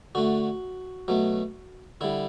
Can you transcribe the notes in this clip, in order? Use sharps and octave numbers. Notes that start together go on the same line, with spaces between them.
D3 A3 F#4
B2 F#3 A3
D3 G3 E4